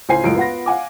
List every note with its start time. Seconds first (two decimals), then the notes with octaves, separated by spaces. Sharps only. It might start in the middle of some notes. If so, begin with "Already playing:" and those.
0.09 C#2 A2 C5 G#5 C7
0.24 C#2 F#2 A2 G#3 D7
0.36 B3 F4 F#5 B5 A#6
0.66 F5 F#5 G#5 D6